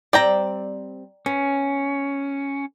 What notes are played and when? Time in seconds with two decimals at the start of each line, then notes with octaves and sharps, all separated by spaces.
0.13 G3 C4 D5 G5 A#5
1.26 B3 C#4